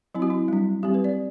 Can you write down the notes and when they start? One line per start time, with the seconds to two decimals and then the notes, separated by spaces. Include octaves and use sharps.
0.15 F#3 C4 E4
0.22 F#4
0.30 E4
0.48 G3 D4
0.83 G3 C4 G4
0.94 B4
1.04 D5